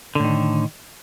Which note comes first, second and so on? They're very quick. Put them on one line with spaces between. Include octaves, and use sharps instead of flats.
D3 A2 D#3